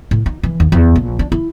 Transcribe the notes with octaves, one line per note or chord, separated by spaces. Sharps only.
A2
D#4
E3
D#2
E2
A#1
D4
E4